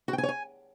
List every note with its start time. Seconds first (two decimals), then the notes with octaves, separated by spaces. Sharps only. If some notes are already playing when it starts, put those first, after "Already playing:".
0.08 F#4
0.13 G5
0.18 G#5
0.23 C#5
0.29 G#5